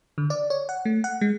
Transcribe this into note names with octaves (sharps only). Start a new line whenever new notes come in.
D3
D5
C#5
F#5
A3
F#5
G#3